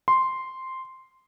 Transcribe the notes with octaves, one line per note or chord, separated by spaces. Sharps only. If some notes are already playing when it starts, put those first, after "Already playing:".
C6